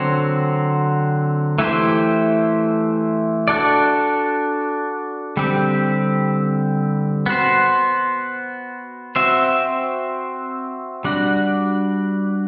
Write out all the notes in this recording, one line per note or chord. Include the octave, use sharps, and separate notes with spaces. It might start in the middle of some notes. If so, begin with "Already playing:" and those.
Already playing: D3 F#3 C4 F#4 C5
E3 A3 E4 G4 C5
D4 F#4 A4 D5
D3 G3 C4 G4
B3 F#4 C5
C4 F#4 C5 E5
G3 D4 F#4